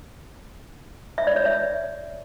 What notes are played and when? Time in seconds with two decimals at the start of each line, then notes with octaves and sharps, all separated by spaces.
1.18 E5
1.27 D5
1.36 C#5
1.45 E5